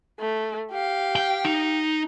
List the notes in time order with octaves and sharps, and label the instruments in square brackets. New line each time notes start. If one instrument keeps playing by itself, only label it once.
[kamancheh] A3
G4 F5
[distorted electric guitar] G5
D#4